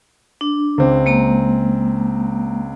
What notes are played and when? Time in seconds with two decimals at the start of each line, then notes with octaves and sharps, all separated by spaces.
0.41 D4
0.78 C#2 C4
1.06 G#3 A#3 A#5